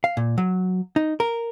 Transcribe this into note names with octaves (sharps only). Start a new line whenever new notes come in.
F5
A#2
F#3
D#4
A#4